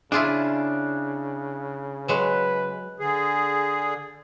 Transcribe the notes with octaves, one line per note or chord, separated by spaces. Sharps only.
C#3 D4 E4 F4 G#4
F#3 G#3 B4
D3 G#4